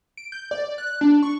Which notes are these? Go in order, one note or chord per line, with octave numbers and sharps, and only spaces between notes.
D7
G6
D5
F#6
D4
C#6